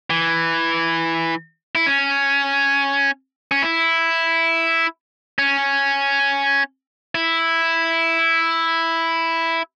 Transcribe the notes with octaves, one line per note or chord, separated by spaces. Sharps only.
E3
E4
C#4
C#4
E4
C#4
E4